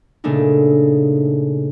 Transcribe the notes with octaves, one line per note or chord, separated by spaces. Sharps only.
A#2 C#3 A3 A#3 D4 D#4